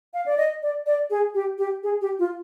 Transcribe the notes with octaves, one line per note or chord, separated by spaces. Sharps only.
F5
D5
D#5
D5
D5
G#4
G4
G4
G#4
G4
F4